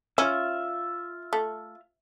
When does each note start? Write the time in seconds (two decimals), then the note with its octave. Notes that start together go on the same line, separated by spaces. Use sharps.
0.18 C#4 F4 E5
1.33 A3